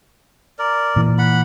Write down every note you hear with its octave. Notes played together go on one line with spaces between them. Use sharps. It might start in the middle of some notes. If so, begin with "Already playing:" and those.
A#4 D5
A#2 E3
F#5 B5